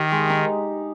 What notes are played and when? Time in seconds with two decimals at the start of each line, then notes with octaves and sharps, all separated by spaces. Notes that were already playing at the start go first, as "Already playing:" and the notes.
Already playing: D#3 D#4 G4
0.12 G#3
0.30 D#4